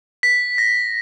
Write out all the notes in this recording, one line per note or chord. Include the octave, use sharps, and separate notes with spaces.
B6
A#6